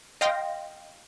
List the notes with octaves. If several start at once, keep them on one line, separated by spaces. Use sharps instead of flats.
D#5 F5 G5 C6 A#6